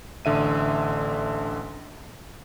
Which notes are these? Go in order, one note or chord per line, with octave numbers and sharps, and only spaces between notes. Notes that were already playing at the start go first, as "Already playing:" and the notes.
A1 D3 E5 D#7